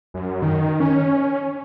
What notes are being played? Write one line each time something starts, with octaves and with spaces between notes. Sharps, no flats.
F#2
D#3
C#4